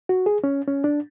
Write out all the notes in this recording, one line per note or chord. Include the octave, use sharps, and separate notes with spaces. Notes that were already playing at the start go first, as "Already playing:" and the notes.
F#4
G#4
C#4
C#4
D4